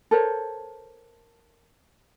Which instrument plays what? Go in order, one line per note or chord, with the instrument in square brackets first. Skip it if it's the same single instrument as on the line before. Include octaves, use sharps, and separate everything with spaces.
[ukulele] A4 A#4 C5 C#5